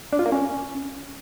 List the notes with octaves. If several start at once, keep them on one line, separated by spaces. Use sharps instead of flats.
D4
F4
A#3
C#4